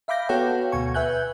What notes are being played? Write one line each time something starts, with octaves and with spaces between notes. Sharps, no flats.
E5 F5 B5 D6 G6 A#6
B3 F#4 A4 C#5 F5 G5
D2 B2 G#5 C#6
B4 E5 G#5 F#6 G6